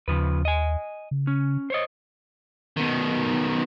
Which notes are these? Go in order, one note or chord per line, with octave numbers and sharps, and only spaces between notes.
D#2 C#3 F3 B4
D#5 G#5
C#3
C#4
C5 C#5 D#5
B2 D#3